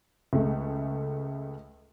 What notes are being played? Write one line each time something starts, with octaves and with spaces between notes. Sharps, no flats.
C#2 G#3 A3